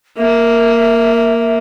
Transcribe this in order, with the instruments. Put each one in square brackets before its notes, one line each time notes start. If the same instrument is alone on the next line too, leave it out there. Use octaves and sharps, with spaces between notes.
[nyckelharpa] A#3 [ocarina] E5